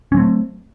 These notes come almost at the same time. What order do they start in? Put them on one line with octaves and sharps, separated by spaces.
C#4 F#3 C4 A3